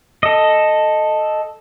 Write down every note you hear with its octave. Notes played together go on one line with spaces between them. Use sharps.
A4 D#5